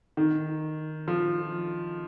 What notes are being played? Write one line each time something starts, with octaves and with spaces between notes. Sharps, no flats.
D#3
F3